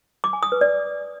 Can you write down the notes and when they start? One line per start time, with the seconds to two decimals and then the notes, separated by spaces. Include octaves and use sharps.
0.24 D6
0.33 G#5
0.43 D#6
0.52 B4
0.61 D5